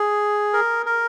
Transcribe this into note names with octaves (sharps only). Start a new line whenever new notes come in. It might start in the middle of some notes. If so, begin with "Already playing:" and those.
Already playing: G#4
A#4
A#4